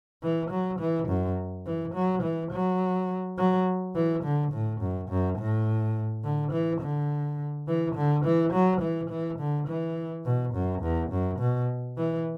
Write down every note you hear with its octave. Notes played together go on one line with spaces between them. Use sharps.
E3
F#3
E3
F#2
E3
F#3
E3
F#3
F#3
E3
D3
A2
F#2
F#2
A2
D3
E3
D3
E3
D3
E3
F#3
E3
E3
D3
E3
B2
F#2
E2
F#2
B2
E3